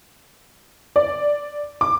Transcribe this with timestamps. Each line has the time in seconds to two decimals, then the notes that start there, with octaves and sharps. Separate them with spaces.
0.96 D5
1.81 D6